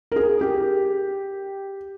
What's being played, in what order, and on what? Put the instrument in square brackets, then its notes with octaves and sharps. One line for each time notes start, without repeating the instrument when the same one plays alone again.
[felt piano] A#4
G#4
G4